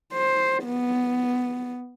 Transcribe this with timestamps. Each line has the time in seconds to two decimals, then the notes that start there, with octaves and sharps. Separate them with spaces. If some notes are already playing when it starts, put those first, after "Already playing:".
0.12 C5
0.64 B3